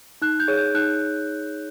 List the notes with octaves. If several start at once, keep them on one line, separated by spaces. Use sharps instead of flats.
D#4 F#6
G6
G#4 C#5
G6
D#4 F#6